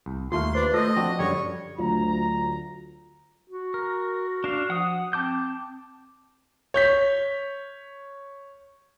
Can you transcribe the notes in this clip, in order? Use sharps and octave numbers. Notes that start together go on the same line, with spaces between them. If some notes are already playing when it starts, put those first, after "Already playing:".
C2
D#2 A3 F4 F5 C6
D4 B4 C5
A3 F4 A4 C5 D#5 A#6
F3 C4 D4 F#4
F#2 D3 G3 C#5
D2 F#3 F4 A#5
F#4
A#4
D4 F5
F3 F#5 D#6
C4 A5 D6 G6
C#5 G6 B6